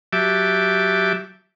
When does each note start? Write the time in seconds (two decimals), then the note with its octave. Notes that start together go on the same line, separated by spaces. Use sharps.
0.13 F#3 G4 E5 A5 D6